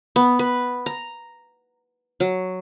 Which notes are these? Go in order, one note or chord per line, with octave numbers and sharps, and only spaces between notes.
B3
B4
A#5
F#3